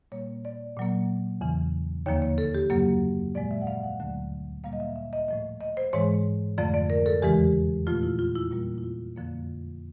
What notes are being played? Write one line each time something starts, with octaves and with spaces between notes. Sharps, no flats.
A#2 G3 A#3 C#5
D5
A#2 F#3 A#3
E2 C#3 E3
D#2 D3 F3 A#3 C#5
C#5
A4
G4
F#2 C#3 F#3 A#3
A#2 F3 G#3 D5
E5
F#5
F5
F#5
D2 D3 F#3 A3
A#2 G3 A#3 F5
D#5
E5
E5
D#5
A2 F3 A3 D#5
D#5
C5
G#2 E3 G#3 C#5
F2 D3 F3 A3 D5
D5
A#4
A4
E2 C#3 E3 G#3 G4
A#2 F3 A3 F4
E4
F4
E4
A#2 G3 A#3 F4
E4
F4
F2 D3 F3 A#3